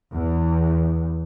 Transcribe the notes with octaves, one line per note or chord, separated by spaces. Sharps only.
E2